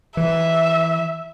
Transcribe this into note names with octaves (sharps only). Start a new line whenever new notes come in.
E3 E5